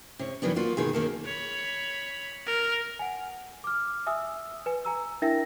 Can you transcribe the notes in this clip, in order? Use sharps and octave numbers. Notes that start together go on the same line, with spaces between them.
C3 C#5
D#3 E3 F#3 B3 D4
A#3 F4 F#4
B2 D#3 G#4
D#2 D#3 A#3 A4
C#5 B5
A#4
F#5 G#5
D6 F6
E5 G#5 D#6 E6
B4 G#5
G#5 A#5 E6
D4 E4 A#4 E5 G5 A#6